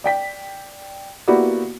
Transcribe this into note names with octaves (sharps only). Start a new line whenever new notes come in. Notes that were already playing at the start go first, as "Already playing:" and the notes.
D5 G5 B6
A#3 B3 E4 F#4 G4 D5